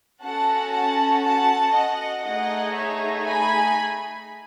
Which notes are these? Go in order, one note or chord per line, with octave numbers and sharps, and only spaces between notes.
C#4 F#4 A4 F#5 A5
F#5 A5
F#5 A5
D#5 F#5
A3 D#4 G#4 D#5 F#5
C#5 E5
G#5 B5